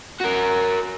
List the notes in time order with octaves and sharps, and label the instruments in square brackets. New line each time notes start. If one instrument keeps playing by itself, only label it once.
[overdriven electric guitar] F#4 A#4